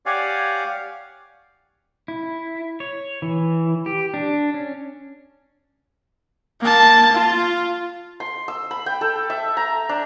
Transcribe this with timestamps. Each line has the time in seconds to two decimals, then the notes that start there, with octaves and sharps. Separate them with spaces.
0.06 G4 C#5 D5 F5 F#5 G#5
2.08 E4
2.80 C#5
3.22 E3
3.86 G4
4.14 D4
4.54 C#4
6.62 A#3 A5
7.13 F4
8.20 C6
8.48 E6
8.71 B5
8.86 G5
9.01 A4
9.30 E5
9.57 A#5
9.89 D4